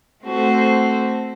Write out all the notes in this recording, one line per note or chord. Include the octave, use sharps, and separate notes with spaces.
A3 C4 F#4 A4 C5